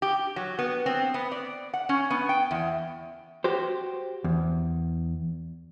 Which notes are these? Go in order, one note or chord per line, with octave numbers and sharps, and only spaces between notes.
G4
F#3
B3
C4
B3
D5
F#5
C#4
B3
G5
E2
F#4 G4 C5
E2